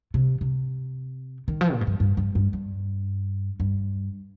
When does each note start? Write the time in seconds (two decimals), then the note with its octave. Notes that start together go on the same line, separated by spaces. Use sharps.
0.14 C3
0.41 C3
1.48 D#3
1.61 F3
1.73 A#2
1.81 G#2
1.87 G2
2.00 G2
2.17 G2
2.35 G2
2.53 G2
3.60 G2